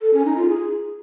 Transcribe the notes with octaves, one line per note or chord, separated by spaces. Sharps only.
A4
C#4
D#4
F4
G#4